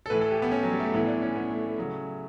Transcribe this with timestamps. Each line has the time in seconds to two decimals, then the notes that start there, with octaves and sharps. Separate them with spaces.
0.06 A4
0.10 A2 E3 B4
0.21 A4
0.31 G4
0.42 B3
0.52 C#4
0.63 F#3
0.72 G3
0.80 A3
0.93 A2 E3 B3
1.07 D4
1.22 C#4
1.36 B3
1.50 A3
1.64 A3
1.78 C#3 F#3